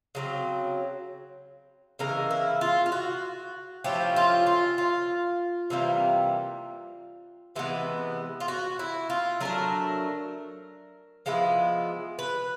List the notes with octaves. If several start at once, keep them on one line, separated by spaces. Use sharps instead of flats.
C#3 F#3 A3 C4
C#3 E3 G#3 A#4
E4
F4
F4
F#4
F3 A3 C#4 E4 G4
F4
F4
F4
C3 E3 G3 A#3
C3 E3 G#3 B3
F4
F#4
E4
F4
F#3 A3 D4 A#4
F3 G#3 B3 E4
B4